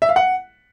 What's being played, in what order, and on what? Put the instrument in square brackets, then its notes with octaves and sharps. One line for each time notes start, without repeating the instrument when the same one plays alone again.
[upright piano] E5
F5
F#5